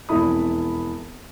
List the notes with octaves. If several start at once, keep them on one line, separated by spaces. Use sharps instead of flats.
E1 F2 E4 B5 D#6